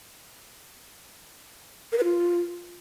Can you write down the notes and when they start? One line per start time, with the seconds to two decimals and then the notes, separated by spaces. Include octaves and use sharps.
1.92 A#4
1.98 B4
2.04 F4